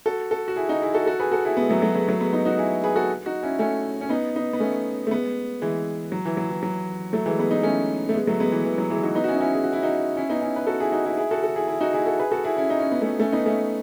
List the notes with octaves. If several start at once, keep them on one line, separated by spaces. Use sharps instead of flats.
F#4 A4
F#4 A4
F#4
E4 G#4
D#4 F#4
E4 G#4
F#4 A4
F#4 A4
G#4 B4
F#4 A4
E4 G#4
G#3 B3
F#3 A3
F#3 A3
G#3 B3
F#3 A3
G#3 B3
B3 D#4
D#4 F#4
E4 G#4
G#4 B4
F#4 A4
D#4 F#4
C#4 E4
A3 C#4
C#4
B3 D#4
B3 D#4
B3
A3 C#4
A3
G#3 B3
E3 G#3
F#3
E3
F#3
E3
F#3
F#3 A3
E3 G#3
G#3 B3
B3 D#4
A3 C#4
A3
G#3 B3
F#3 A3
G#3 B3
E3
E3
F#3
E3 G#3
D#4 F#4
B3 D#4
F#4
C#4 E4
D#4
C#4 E4
G#4
F#4
E4
D#4 F#4
C#4 E4
B3 D#4
C#4 E4
B4
F#4 A4
E4 G#4
D#4 F#4
E4 G#4
E4 G#4
F#4 A4
F#4 A4
E4 G#4
E4 G#4
D#4 F#4
E4 G#4
F#4 A4
G#4 B4
F#4 A4
E4 G#4
C#4 E4
D#4
C#4
B3
A3 C#4
A3 C#4
B3 D#4
A3 C#4